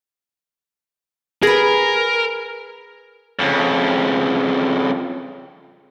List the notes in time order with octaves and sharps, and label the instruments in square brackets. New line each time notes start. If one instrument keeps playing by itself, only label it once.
[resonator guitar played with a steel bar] G#4 B4 [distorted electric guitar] A#4
[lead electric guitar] F2 C#3